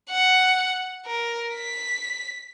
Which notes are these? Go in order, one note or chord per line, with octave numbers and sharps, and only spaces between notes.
F#5
A#4
B6